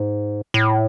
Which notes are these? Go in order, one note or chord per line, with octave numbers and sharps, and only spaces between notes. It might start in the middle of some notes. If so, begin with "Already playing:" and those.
Already playing: G#2
A2